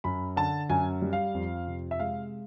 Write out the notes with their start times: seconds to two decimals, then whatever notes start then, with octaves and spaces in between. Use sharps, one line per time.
0.04 F#2 B5
0.36 D3 A5
0.70 F#2 G#5
1.02 G3
1.13 F5
1.34 F2
1.67 C3
1.91 E5
2.00 G#3 F5